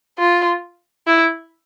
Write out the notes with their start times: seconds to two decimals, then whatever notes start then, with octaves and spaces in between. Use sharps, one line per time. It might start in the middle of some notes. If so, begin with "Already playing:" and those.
0.18 F4
1.07 E4